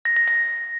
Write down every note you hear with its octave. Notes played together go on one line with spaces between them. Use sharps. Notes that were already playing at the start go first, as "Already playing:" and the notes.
A#6
A#6
A#6